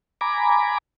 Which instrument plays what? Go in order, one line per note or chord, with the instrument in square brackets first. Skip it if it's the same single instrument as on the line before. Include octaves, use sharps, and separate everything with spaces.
[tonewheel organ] G#5 A#5 B5 D6